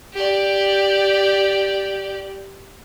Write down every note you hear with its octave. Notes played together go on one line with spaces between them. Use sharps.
G4 D5